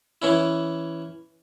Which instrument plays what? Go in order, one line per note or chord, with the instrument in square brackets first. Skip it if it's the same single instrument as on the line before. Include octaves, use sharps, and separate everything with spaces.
[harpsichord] E3 C#4 E4